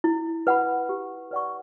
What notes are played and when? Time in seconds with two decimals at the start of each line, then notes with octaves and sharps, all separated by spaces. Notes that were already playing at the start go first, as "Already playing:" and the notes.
0.04 E4
0.47 B4 F#5 B5
0.89 G4
1.31 B4 D5 F#5 C#6